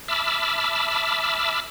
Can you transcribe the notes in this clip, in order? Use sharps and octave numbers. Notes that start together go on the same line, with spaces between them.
E5 A5 B5 D6 E6 F6